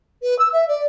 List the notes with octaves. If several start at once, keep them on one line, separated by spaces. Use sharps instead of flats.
B4
E6
E5
D5